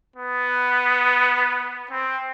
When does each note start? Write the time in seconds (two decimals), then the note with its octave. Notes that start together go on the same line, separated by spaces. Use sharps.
0.16 B3
1.91 C4